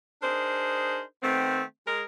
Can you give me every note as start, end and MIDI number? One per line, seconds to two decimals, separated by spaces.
0.22 1.01 62
0.22 1.01 63
0.22 1.01 68
0.22 1.01 70
0.22 1.01 72
1.22 1.61 51
1.22 1.61 57
1.22 1.61 59
1.22 1.61 60
1.86 2.02 56
1.86 2.02 70